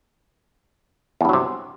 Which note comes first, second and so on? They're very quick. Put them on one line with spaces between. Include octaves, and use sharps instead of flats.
E2 G2 F#3 C3